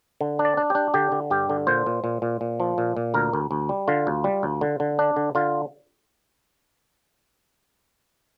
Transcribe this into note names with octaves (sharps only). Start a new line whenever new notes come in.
D3
D4
D5
D4
D4 G4
D3 G4
D3
G2 G4
D3
A#2 C5
A#2
A#2
A#2
A#2
F3
A#2
A#2
D2 A#4
D2
D2
G3
D3 F4
D2
G3
D2
D3
D3
D4
D3
D3 F4